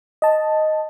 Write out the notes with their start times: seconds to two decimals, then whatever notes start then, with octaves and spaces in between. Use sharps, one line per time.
0.22 D#5 A5